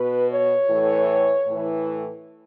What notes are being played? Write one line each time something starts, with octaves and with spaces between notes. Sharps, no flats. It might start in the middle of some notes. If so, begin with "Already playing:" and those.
Already playing: B2 B4
C#5
A2 E3
A2 E3